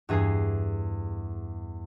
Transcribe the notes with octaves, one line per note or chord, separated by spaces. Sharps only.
E2 G2 G#4 G#5 C7